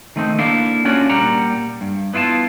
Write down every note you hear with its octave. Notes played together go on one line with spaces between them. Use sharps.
D#3 A3 C4 D#4
A#3 D4 E4 A4 D5 F5
C#4 D4 F4 F#4 C#5 D5
A#2 G3 G4 F#5 A#5
G2
B3 E4 F4 D5 A5